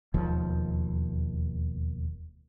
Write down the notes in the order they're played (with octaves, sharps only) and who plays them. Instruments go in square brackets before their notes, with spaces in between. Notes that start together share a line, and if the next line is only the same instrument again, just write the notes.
[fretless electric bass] E1 D#2 F3